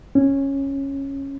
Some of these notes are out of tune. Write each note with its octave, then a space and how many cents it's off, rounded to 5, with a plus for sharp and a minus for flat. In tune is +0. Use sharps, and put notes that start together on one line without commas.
C#4 -10